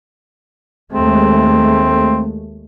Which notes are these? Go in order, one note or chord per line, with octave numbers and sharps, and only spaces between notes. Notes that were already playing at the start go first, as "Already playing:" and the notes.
D#2 G#3 A3 C4